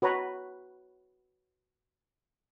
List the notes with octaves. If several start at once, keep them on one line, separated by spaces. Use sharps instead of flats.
F#4 B4 C#5 A#5